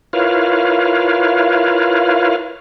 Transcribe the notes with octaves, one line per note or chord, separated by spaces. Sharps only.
E4 F4 A#4 B4 C#5 F5